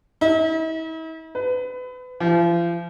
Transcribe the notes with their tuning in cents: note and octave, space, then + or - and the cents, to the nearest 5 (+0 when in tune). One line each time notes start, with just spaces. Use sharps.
E4 -45
B4 +25
F3 -40